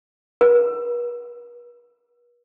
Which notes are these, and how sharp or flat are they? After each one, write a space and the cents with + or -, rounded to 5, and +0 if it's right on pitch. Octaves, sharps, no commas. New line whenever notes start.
B4 -45